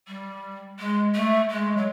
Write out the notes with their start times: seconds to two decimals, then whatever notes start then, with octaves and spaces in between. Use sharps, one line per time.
0.07 G3
0.79 G#3
1.14 A3
1.50 G#3
1.77 F#3